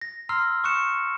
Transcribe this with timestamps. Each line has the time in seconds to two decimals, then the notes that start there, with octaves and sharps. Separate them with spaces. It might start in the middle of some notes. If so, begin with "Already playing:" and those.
0.01 A#6
0.29 A#5 C6 E6 F6 A#6 C7
0.64 C#6 D#6 F#6 C#7 E7